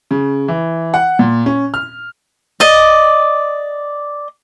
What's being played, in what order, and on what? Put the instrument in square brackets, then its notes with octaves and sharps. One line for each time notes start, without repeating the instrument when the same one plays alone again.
[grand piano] C#3
E3
F#5
A#2
C#4
F6
[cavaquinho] D5 D#5